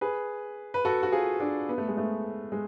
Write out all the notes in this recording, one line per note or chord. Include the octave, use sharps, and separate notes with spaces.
G#4 B4
B4
F#4 A4
F#4
F4 G#4
D4 F#4
B3
A3
G#3
A3
G#3